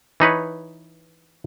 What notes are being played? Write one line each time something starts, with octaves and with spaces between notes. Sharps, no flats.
E3 D#4 B4 C#5